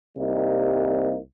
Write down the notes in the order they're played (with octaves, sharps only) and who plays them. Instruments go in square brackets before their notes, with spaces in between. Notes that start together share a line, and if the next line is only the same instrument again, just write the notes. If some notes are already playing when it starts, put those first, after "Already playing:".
[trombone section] C2 C3 G3 A#3 D#4